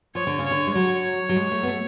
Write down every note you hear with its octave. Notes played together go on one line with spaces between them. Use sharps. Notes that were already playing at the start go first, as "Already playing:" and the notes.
F3 C#5
D3
C#3
C#5
D3
G#3
F#3 C#5
F#3
G#3
A3
B3
A3